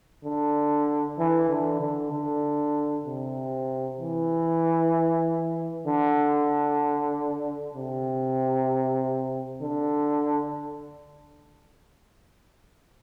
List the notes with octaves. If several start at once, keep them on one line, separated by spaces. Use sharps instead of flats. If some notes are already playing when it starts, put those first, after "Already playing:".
D3
E3
D3
D3
D3
C3
E3
D3
C3
D3